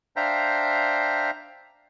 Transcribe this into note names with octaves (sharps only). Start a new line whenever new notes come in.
D4 C5 E5 F5 G5 A#5